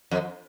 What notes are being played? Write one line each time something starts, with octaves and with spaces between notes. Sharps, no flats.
F2